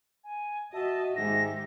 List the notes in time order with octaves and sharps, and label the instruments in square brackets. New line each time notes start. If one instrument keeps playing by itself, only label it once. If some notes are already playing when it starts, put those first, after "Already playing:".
[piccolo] G#5
[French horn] F#4 [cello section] D#5 [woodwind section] E5 [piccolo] A5
[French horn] G#2 [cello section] D#3 G#3 G4 [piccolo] A#6